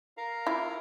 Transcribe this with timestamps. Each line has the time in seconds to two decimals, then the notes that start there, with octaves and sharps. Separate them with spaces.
0.17 A#4 F5 A#5
0.47 E4 F4